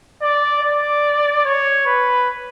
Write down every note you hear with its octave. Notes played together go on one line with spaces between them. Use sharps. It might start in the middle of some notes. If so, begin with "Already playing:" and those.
D5
D5
C#5
B4